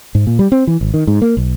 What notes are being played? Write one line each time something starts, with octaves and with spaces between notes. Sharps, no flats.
G#2
A#2
G3
C4
E3
G#1
D#3
G#2
A#3
B1